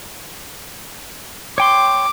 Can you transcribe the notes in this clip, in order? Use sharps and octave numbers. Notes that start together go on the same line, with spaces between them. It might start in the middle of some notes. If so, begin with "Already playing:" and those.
C#5 G5 C6 D6